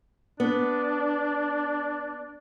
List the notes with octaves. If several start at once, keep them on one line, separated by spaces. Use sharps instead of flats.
B3 D4